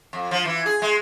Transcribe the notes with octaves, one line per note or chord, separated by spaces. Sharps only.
F2
F3
E3
G#4
G#3